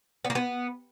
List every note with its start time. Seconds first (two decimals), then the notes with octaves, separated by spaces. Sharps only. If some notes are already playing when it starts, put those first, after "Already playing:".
0.25 B3
0.30 A#3
0.35 B3